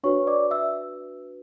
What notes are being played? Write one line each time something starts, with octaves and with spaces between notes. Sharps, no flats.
D4 F#4 B4 C#5 C#6
D5 D6
E5 E6